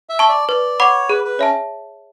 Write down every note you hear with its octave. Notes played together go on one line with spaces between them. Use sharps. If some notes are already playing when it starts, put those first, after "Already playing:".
E5
A5 C#6
D5
B4 D5
C#5 F#5 B5 D6
G#4 B4
B4
C#4 C#5 E5 A5